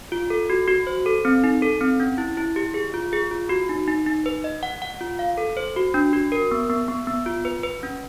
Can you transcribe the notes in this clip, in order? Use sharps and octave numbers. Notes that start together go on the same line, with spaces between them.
F4
A4
F#4
F#4
C5
A4
C4
D#4
A4
C4
C#4
E4
E4
G4
G#4
F4
G#4
F4
F#4
D#4
D#4
D#4
B4
D#5
F#5
F#5
F4
F5
A4
C5
F#4
D4
F#4
A#4
B3
B3
B3
B3
F4
B4
B4
C#4